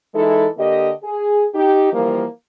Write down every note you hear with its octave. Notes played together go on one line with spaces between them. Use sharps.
E3 G#3 D#4 E4 A4
D3 A#3 G4 D#5
G#4
D#4 G4
E3 F3 G3 A#3